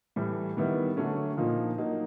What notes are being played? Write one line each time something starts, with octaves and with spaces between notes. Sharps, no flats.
A2 E3 G3
D#3 G3 B3 E4
D3 F#3 A3 C#4
A#2 F3 A#3 D#4
F#3 A#3 D#4